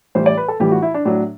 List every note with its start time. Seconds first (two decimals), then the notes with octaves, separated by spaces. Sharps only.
0.15 A2 E3 G3 C5
0.26 D5
0.37 B4
0.48 A4
0.60 A2 E3 G3 G4
0.72 F#4
0.82 E4
0.94 D4
1.05 A2 F#3 D4